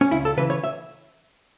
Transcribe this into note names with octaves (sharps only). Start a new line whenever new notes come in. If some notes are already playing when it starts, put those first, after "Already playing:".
C#4
C#2 E4
A4
C#3 E3 B4
C#5
E5